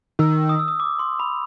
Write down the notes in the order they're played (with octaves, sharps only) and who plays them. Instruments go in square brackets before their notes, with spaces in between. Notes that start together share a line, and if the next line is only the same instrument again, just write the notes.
[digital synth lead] D#3 [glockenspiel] E6
[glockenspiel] D#6
E6
D#6
D6
C6
B5